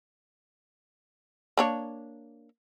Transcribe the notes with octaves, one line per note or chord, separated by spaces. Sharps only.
A#3 D4 C#5